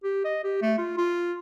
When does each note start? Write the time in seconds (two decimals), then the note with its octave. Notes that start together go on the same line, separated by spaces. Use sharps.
0.04 G4
0.24 D#5
0.44 G4
0.62 A3
0.78 F4
0.97 F4